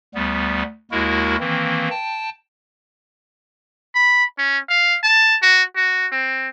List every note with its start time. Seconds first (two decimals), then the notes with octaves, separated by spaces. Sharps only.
0.14 D2 G3 B3
0.91 D#2 G#3 A#3 E4 F#4 A#4
1.40 D#3 E3 A#3 C4
1.90 G5 A5
3.95 B5
4.38 C#4
4.69 F5
5.03 A5
5.42 F#4
5.76 F#4
6.12 C4